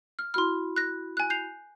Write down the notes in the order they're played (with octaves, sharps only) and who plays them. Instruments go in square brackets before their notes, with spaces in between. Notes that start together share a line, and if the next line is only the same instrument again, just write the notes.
[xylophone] F6
[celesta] E4 F#4 B5 [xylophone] C6 F6
[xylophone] F#6 A#6
G#5 F#6
G6 C7 F7